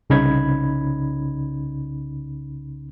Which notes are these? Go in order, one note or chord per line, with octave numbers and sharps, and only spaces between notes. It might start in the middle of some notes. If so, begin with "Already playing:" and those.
C2 C#3 C#4 D#4 B5 G#6